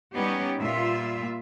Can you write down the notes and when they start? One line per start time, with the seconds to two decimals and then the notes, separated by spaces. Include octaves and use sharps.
0.14 G3 B3 C#4 D#4 G4
0.59 A#2 G3 F4 E5